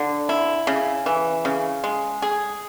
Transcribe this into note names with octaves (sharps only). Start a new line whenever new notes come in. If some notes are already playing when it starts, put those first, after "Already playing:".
Already playing: D3
E4
C#3
E3
C#3
G#3
G#4